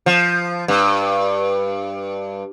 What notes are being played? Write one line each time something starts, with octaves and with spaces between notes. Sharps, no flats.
F3
G2